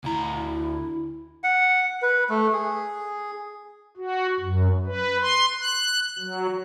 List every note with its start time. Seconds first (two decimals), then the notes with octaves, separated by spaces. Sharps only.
0.04 D2 E4 A#5
1.44 F#5
2.02 B4
2.30 A3
2.53 G#4
3.97 F#4
4.40 F#2
4.86 B4
5.21 C6
5.59 F#6
6.19 F#3